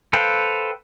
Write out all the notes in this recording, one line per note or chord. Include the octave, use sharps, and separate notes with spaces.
A4 B4 C5 F5 G5